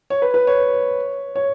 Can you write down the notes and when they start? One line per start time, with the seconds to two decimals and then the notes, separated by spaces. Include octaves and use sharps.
0.10 C#5
0.22 B4
0.34 B4
0.47 C#5
1.35 C#5